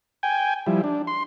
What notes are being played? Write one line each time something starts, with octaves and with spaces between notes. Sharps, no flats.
G5 G#5
F3 G3 E4
D4
C6